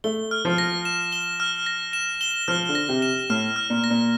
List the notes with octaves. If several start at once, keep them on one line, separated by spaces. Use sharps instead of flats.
A3 G7
F6
F3
A#6
E7
G7
F6
A#6
E7
G7
F3 F6
D3
A#6
C3
E7
A2 F6
F6
A#2
A#6
A#2